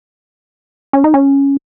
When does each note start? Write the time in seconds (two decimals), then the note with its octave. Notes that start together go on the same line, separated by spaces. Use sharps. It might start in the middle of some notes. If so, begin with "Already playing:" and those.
0.93 C#4
1.04 D#4
1.14 C#4